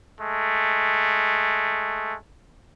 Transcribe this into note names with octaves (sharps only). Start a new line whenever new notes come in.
G#3 A3